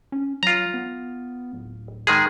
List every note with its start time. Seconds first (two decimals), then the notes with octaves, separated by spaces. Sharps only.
0.12 C#4
0.43 F#3 F4 A#5
0.74 B3
1.53 D1
2.07 D#3 G#3 G#4